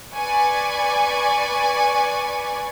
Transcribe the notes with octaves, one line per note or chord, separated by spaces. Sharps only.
B4 D5 G#5 C#6